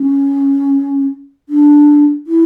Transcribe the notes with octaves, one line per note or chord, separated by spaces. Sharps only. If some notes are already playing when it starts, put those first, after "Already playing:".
Already playing: C#4
D4
E4